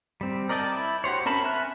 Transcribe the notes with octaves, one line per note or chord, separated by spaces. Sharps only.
G3 C4
A#4 D5 D#5 G5 A5
E4
F#4 G4 C5 C#5
C4 C#4 A#4 A5 B5
E5 G#5 B5 F6 F#6